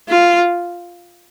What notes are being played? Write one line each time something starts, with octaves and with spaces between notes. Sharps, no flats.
F4